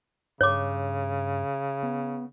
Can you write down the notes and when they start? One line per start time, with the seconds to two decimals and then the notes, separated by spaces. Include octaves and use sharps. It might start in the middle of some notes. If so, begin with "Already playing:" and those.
0.41 G2 C#3 C#5 D6
1.83 B3